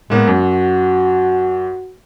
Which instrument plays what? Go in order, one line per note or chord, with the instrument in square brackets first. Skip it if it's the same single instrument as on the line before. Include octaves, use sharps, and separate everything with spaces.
[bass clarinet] A2 [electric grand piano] G#3 A#3 B3
[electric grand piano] F#2 [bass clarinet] F#4